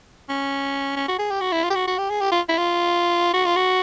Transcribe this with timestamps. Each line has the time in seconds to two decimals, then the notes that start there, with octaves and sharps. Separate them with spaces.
0.29 C#4
0.96 C#4
1.08 F#4
1.19 G#4
1.31 G4
1.41 F#4
1.52 E4
1.64 F4
1.70 G4
1.75 F#4
1.87 F#4
1.98 G4
2.10 G#4
2.21 G4
2.32 F4
2.49 E4
2.58 F4
3.34 F#4
3.45 F4
3.56 F#4